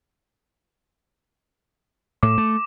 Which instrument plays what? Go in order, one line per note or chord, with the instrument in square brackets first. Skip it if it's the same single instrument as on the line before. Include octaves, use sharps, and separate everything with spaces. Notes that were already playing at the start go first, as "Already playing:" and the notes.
[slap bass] A2 [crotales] D6
[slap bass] A3